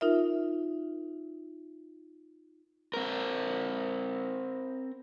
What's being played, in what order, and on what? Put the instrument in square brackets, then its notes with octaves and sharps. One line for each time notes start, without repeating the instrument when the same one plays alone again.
[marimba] D#4 F4 A#4 E5
[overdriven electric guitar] C4 A#4